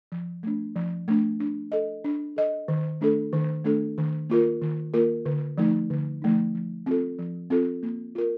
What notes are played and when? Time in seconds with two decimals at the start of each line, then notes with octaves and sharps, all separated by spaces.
0.12 F3
0.43 A3 D4
0.76 F3
1.08 A3 D4
1.40 D4
1.72 A4 D#5
2.04 D4
2.36 A4 D#5
2.68 D#3
3.01 A3 D4 A4
3.33 D#3
3.64 A3 D4 A4
3.98 D#3
4.30 A#3 F4 A#4
4.62 D#3
4.94 A#3 F4 A#4
5.26 D3
5.58 F3 A3 D#4
5.90 D3
6.22 F3 A3 D#4
6.55 F3
6.86 C4 F4 A4
7.19 F3
7.50 C4 F4 A4
7.83 A#3
8.15 F4 A#4